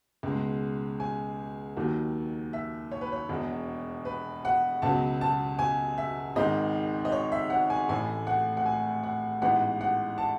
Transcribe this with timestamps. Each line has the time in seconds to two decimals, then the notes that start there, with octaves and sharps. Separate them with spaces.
0.23 C#2 B2 G#3
1.00 G#5
1.77 D#2 D#3 F#3
2.53 E5
2.92 C#5
3.01 B4
3.12 C#5
3.29 E1 E2 B2
4.05 B4
4.45 F#5
4.82 C#2 B2 F#3 B3 A5
5.21 A5
5.59 G#5
5.98 E5
6.36 G#1 G#2 D#3 D#5
7.05 D#5
7.12 C#5
7.32 E5
7.50 F#5
7.70 G#5
7.89 A1 A2 E3 A3 G#5
8.27 F#5
8.57 F#5
8.66 G#5
9.03 F#5
9.42 A1 G#2 E3 B3 F#5
9.81 F#5
10.18 A5